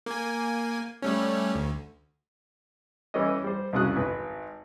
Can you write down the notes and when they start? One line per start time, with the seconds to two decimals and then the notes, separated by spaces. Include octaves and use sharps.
0.06 A#3 G#5
1.02 G3 A3 C#4
1.55 D2
3.14 E3 G3 C#4 E4 D#5
3.44 G3 C5
3.73 C2 F2 C#3 F#3 D#6 F#6
3.97 G#1 B4